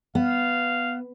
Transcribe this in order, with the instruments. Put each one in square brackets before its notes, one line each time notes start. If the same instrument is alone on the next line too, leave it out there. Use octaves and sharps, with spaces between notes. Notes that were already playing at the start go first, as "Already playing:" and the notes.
[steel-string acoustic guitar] B3 [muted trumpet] F5